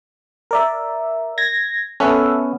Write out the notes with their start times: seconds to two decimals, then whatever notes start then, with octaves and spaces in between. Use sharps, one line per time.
0.51 A#4 D5 E5
1.38 G#6 A#6
2.00 B3 C#4 A4 E5 F#5